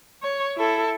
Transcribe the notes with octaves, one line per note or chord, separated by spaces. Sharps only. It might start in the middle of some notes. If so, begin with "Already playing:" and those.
C#5
E4 A4